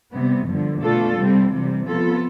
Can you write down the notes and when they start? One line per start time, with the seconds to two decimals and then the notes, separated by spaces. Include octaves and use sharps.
0.12 C3 G3 B3
0.47 G2 D3 F3
0.81 B2 A3 D4 F4 A4
1.16 C3 G3 C4
1.51 C3 E3 G3
1.85 C3 F3 B3 F4 A4